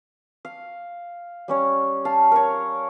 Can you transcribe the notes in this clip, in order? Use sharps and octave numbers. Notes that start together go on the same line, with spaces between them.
F5
G3 C#4 C#5
F5 A5
A#4 C#5